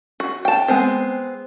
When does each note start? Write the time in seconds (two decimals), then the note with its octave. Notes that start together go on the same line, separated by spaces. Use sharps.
0.20 F#4
0.45 G5 A5
0.68 G#3 B3 C4 C5